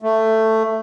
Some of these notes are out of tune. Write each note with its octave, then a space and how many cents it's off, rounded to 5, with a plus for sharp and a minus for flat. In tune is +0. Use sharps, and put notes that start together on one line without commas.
A3 +10